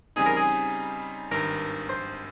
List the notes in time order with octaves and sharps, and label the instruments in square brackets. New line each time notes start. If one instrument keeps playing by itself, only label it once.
[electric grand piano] C#3 G3 C4 D#4 [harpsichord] G#4
[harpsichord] A#4
G#4
[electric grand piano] G#1 G2 D#3 [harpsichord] A#4
[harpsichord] C5